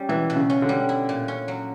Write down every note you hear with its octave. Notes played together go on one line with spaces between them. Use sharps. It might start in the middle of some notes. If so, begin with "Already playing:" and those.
Already playing: G3 C#4
B2 E3
B2
C#3
C#4
D3
G3
E4
A#2
C#4
F#3